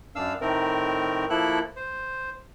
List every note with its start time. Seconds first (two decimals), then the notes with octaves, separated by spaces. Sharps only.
0.16 F#2 D4 F5 E6
0.41 A2 D#3 A3 C4 A#4
1.30 F3 A#3 E4 A4 F#6
1.76 C5